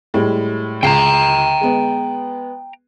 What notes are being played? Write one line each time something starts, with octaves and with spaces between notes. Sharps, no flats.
A2 G3 G#3
C#2 G5 A5 A#5 C7
G#3 B3